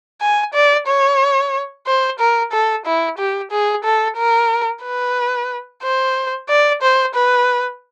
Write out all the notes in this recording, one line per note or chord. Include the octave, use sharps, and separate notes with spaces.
G#5
D5
C#5
C5
A#4
A4
E4
G4
G#4
A4
A#4
B4
C5
D5
C5
B4